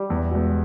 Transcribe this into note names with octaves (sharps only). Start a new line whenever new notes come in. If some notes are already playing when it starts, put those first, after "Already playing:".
Already playing: G3
E2
B2 G#3 B3